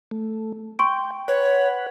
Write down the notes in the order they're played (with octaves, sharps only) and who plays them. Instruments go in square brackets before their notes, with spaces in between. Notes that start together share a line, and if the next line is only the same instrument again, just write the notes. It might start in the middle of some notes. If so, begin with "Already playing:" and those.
[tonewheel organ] A3
[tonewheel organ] G5 [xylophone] C6 C#6 D7
[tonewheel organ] B4 F#5 [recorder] C#5